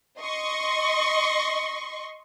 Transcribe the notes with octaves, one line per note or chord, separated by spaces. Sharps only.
D#5 C6 C#6